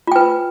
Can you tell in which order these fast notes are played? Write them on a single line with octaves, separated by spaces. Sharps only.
F4 G5 B4